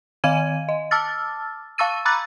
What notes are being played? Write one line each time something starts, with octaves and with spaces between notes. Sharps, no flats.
D#3 D#5 F5 G#5 G#6 D#7
D#5
A5 D6 E6 F6 A6
F5 A5 C#6 E6 A6 D#7
A#5 B5 D6 E6 F#6 A6